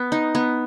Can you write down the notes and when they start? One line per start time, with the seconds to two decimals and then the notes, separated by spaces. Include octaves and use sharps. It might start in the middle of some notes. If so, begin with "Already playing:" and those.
Already playing: B3
0.12 D#4
0.35 B3